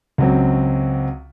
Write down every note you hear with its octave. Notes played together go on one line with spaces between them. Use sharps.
C#2 F#3 C4